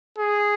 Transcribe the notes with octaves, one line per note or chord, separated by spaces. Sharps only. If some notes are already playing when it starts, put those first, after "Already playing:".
G#4